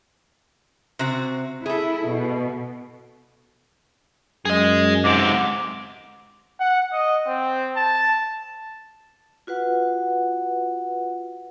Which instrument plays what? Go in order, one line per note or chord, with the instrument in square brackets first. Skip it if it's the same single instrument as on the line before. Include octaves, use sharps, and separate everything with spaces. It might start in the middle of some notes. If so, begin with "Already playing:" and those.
[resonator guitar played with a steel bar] C3 C4 F#4
[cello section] E4 [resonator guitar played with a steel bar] G#4 A4
[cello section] B2
[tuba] F#2 [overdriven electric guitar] G#4 D#5
[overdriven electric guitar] G#2 C3 [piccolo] D6
[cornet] F#5
D#5
C4
A5
[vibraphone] F4 F#4 B4 F#5